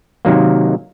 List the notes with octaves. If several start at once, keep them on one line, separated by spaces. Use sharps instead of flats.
C3 D#3 F#3 A#3